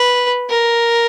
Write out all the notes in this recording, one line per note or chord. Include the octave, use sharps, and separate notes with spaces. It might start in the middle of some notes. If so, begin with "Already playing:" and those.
Already playing: B4
A#4